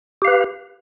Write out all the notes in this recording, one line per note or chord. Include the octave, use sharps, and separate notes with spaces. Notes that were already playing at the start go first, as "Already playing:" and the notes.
G4 B4 F5